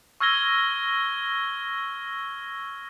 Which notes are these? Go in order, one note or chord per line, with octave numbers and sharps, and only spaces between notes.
C#6 E6 F6 G#6 A#6 G7